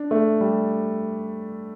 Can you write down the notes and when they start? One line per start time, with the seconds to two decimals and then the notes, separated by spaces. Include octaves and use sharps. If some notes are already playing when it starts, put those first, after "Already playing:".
Already playing: D4
0.11 A3
0.41 G3